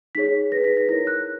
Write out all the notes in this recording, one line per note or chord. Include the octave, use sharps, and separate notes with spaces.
D#4 G#4 C#5 B6
D#4 G#4 B4 A#6
B6
A#6
E4 A#4 C#5 A#6
F#6